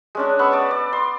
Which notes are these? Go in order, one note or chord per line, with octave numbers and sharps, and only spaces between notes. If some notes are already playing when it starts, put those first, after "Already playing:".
G#3 C#4 D4
B3 B5 C#6 E6
D5 A5
D5
C6